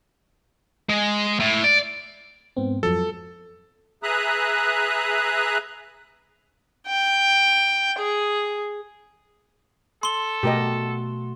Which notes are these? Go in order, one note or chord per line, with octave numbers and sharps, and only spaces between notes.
G#3
A2
D5
G#2 B3 C4
F2 F3 F#3 A4
G#4 B4 E5 A#5 D#6 F#6
G5
G#4
A4 C6 G7
B2 A3 F#4 G4 A#4 D#5